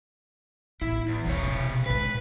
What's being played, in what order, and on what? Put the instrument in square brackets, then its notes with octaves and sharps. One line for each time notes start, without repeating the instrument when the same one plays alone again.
[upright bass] A1 B3 [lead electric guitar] E4
[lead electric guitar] E2
[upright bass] E1 C#4 [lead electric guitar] C3 C#5
[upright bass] B2
[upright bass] B1 G#2 [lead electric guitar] B4